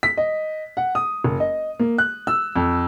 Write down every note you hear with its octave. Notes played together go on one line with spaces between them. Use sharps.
B6
D#5
F#5
D#6
F#1
D#5
A#3
F#6
E6
F2